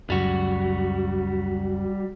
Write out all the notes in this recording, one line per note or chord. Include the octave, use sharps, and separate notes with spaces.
C#2 F#2 G3 F#4